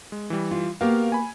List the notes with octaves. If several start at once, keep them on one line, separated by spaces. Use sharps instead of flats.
G#3
E3 G3
F4
A#3 B3 F#4 G4 A#4 F5
G#5 B5